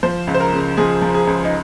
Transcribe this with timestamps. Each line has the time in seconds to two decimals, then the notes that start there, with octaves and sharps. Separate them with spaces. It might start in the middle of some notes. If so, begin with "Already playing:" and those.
0.03 F3 C5
0.27 C#2
0.34 C5
0.40 A#4
0.53 C#3
0.77 F3 G#4
1.02 F3
1.14 G#4
1.27 C#2
1.45 D#4